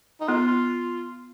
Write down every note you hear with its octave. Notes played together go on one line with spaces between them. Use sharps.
D#4
B3 F4
F4